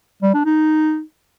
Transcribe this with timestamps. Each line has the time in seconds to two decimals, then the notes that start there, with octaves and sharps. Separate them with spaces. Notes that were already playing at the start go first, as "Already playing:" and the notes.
0.23 G3
0.34 D4
0.46 D#4